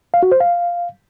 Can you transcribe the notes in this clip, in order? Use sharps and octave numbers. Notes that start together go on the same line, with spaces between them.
F5
F#4
C5
F5